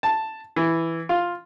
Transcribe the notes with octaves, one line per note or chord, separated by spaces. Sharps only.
A5
E3
F4